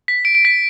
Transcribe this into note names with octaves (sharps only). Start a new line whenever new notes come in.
B6
D7
D7
B6